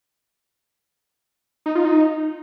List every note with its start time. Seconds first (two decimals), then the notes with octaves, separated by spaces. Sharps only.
1.66 D#4
1.75 F4
1.85 D#4